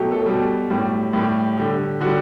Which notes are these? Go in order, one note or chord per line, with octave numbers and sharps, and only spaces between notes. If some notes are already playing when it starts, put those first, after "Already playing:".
Already playing: B2 F#3 A3 G4
A4
B2 G3
A2 G3
A2 G3 G4
D3 G3 G4
D3 G3 F#4